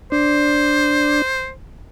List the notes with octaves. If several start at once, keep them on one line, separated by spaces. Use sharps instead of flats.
D4 C5